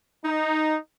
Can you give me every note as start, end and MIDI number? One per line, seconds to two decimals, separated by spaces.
0.25 0.76 63